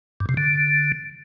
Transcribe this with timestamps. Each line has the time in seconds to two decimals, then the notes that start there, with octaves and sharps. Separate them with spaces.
0.20 G2
0.29 C3
0.37 D3